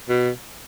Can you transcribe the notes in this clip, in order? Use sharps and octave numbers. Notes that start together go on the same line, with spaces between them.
B2